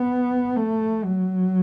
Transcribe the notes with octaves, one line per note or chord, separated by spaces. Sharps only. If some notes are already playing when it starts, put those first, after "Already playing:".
Already playing: B3
A3
F#3